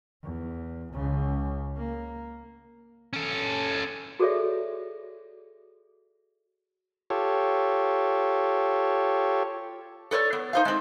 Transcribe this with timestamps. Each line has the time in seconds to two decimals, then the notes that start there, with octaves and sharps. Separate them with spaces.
0.24 E2
0.93 C#2 C#3
1.77 A#3
3.13 C#4 A4
4.20 F#4 G#4 A4 C#5 D5 E5
7.10 F4 G4 A4 C#5
10.11 A4 B4 C#5 D5
10.33 B3
10.53 D#4 C5 F5
10.65 G#3 C4